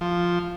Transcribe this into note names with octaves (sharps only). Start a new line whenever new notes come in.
F3